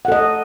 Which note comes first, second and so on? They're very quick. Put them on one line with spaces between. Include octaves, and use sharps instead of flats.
F#5 A4 D#5